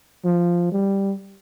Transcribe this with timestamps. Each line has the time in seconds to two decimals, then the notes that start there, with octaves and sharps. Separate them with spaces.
0.25 F3
0.72 G3